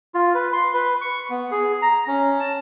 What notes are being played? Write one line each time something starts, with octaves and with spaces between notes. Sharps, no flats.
F4
B4
C6
B4
C#6
B3
G#4
A#5
C#4
A5